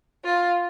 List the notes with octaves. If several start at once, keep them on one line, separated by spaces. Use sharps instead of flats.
F4